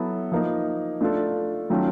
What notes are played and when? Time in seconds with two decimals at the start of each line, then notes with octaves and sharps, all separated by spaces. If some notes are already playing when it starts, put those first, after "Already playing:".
Already playing: F#3 B3 E4 A4
0.32 F3 A#3 D#4
1.01 A3 D4 F4 A4
1.70 D#3 F#3 A3 C#4 F4